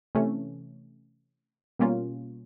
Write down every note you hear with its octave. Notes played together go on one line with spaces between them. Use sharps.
C3 E3 A3 C#4
B2 G3 A#3 C#4 F4